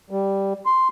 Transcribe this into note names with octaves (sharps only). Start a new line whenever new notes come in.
G3
C6